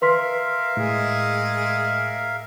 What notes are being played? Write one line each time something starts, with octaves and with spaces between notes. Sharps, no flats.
A#4 B4 E5 F5 C6 B6
A2 G#3 G#4